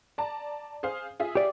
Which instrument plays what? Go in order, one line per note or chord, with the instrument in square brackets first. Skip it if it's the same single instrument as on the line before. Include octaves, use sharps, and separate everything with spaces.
[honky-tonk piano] D5 A5 A#5
G#4 C5 F5
F4 G#4 E5
[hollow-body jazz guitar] G4 D5